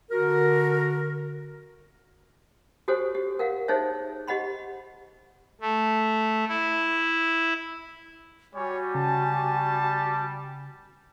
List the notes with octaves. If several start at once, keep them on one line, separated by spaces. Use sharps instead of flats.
D3 F#4 A#4
F#4 G4 A4 C5 C#5
G4
A#4 F5 F#5
D#4 G#4 A4 C5 C#5 E5
G4 D#5 F#5 B5 C6
A3
E4
G3 F#4 C#5 G#5
C#3 A5